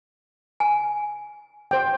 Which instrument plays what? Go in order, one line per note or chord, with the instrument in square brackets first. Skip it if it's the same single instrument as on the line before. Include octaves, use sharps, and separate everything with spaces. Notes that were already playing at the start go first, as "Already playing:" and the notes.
[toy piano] G#5
[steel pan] C5 G5